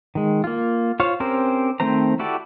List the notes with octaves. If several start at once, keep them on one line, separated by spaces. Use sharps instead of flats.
D#3 G#3
A#3 F4
F4 C5 C#5 F5
C4 C#4 G4 A#4 C5
D#3 A3 C4 C5 A#5
E4 F#4 G4 A4 D5